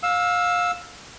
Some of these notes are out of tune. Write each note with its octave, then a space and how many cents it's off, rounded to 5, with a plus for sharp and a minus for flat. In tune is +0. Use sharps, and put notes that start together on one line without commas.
F5 +25 E6 +0